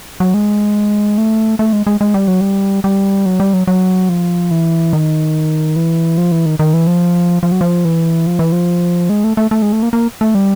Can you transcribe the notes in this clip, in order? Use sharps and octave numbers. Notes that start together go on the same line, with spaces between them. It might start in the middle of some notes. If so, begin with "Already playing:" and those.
F#3
G#3
A3
A3
G#3
G#3
G#3
G3
F#3
G3
G3
F#3
G3
F#3
F#3
F3
E3
D#3
E3
F3
E3
D#3
D#3
E3
F3
F3
F#3
F3
E3
F3
E3
F3
G#3
A3
A3
A3
G#3
A3
A#3
A#3
A3
G3